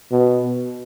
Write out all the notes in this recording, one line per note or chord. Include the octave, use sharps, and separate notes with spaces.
B2